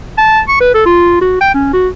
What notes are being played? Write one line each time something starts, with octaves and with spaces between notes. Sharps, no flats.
A5
C#6
B4
A4
F4
F#4
G5
C#4
F#4